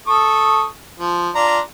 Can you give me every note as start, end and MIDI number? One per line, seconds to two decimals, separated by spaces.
0.07 0.65 69
0.07 0.65 85
0.07 0.65 87
1.00 1.29 53
1.35 1.59 62
1.35 1.59 65
1.35 1.59 82